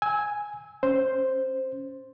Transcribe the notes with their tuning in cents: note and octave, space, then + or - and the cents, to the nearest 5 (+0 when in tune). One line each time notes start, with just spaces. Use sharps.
G#5 +0 E6 -25
C#4 +0 C5 +0